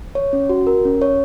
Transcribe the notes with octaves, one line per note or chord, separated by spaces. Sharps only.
C#5
C#4
F#4
A#4
C#4
C#5